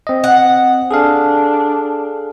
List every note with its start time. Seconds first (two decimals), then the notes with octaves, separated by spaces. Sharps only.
0.07 C4 D#5
0.24 F#5
0.91 D4 G#4 A4 F5